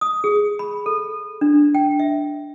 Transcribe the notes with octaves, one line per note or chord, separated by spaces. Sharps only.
D#6
G#4
B5
A4
D4
G5
E5